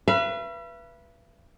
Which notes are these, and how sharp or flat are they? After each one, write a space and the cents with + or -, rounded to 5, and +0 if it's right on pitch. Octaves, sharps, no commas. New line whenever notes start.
B4 -15 E5 +45